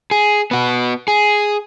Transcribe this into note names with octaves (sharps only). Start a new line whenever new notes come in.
G#4
B3 F#4
G#4